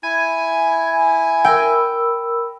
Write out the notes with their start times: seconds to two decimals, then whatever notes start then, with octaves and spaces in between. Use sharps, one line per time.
0.03 E4 G#5
1.45 A#4 G5 B5 E6